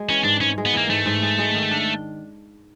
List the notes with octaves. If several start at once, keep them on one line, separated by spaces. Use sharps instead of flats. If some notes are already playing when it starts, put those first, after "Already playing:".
Already playing: G#3
E3 C#4
G#2 D4
G#2 C#4
G#3
B3
E3 A#3
G#2 A3
G#2
G#3
G#3
D#3
D4